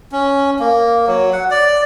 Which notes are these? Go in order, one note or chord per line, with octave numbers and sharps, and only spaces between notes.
C#4
A#3
F#3
F#5
D5